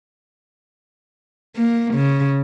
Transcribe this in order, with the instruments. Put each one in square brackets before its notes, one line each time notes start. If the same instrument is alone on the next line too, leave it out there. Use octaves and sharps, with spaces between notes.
[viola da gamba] A#3
C#3